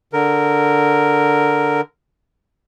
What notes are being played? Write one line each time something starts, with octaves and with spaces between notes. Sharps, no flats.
D3 A#4